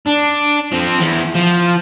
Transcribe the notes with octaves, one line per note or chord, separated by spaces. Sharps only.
D4
F3 C4
E2
F3